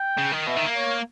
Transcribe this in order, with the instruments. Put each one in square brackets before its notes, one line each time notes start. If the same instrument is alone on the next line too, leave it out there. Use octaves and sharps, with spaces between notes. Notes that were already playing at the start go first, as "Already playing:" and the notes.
Already playing: [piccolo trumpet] G5
[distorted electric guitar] C#3
D#3
[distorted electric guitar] B2 [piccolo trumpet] E5
[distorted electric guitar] D#3
A#3
[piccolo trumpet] C#5